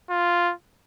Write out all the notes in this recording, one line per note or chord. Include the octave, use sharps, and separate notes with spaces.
F4